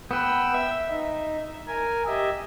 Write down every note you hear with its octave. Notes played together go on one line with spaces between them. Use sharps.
B3 B4 G5 E6
E5
D#4
A#4 G#5
G4 D#5 E5